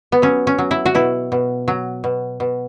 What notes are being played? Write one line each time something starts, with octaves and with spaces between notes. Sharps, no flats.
B3
F#3 C#4
C#4
F#3
E4
F#4
B2 E4
B2
F#3
B2
B2